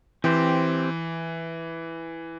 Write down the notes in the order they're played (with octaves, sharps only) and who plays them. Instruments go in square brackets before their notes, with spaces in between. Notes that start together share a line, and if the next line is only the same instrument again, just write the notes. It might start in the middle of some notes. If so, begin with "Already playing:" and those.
[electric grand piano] E3 [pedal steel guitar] C4 G4 C5